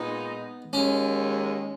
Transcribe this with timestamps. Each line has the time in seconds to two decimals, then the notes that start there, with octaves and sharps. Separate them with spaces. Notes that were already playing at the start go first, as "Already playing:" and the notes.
Already playing: A#2 G#3 B3 D#4
0.73 D#2 D#3 G#3 C#4